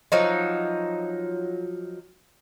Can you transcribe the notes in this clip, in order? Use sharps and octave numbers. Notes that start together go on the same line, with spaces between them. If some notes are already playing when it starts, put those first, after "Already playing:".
F3 F#3 D#4